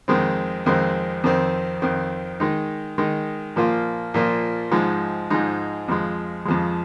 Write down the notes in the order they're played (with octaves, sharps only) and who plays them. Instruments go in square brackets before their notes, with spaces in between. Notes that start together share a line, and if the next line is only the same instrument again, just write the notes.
[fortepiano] F2 D#3 G#3 C4
F2 D#3 G#3 C4
F2 D#3 C4
F2 D#3 C4
D#3 G#3 D#4
D#3 G#3 D#4
A#2 F3 A#3 F4
A#2 F3 A#3 F4
G#2 F3 G#3 D#4
G#2 F3 G#3 D#4
F2 F3 G#3
F2 F3 G#3